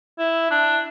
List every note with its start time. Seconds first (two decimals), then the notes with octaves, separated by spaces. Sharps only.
0.18 E4
0.50 D4